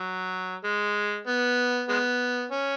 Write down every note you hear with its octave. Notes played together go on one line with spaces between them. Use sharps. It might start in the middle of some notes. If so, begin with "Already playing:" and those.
Already playing: F#3
G#3
B3
G#3 B3
C#4